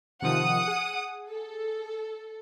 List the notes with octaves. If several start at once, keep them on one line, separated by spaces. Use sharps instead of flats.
C3 D#3 F3 F#5 D#6
G#4
A4